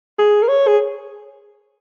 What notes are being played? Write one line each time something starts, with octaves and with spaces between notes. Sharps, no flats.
G#4
A#4
C#5
G#4